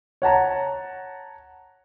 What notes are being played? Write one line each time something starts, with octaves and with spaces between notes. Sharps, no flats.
C#5 F#5 A5 A#5